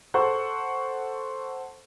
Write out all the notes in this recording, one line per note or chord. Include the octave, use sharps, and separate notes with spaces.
A4 C5 F#5 C#6